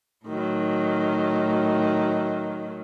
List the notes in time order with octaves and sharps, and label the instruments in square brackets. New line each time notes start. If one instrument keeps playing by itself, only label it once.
[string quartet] A2 D#3 F#3